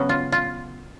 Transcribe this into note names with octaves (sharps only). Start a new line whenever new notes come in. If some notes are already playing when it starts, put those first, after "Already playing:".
Already playing: C#3 F#3 B3 C#4
F4
F4